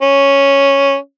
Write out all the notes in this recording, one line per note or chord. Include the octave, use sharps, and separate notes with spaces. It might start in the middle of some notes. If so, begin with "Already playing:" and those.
C#4